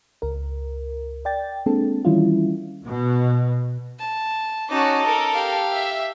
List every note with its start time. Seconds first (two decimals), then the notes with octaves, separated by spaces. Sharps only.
0.22 C#2 A#4
1.25 D5 G5 A6
1.66 G#3 A#3 C4 D4 A4
2.05 D#3 E3 G3 C#4 E4 F4
2.86 B2
3.99 A5
4.70 C#4 D#4 F#4 A5 D6
5.02 A4 A#4
5.34 G4 F5
5.74 E5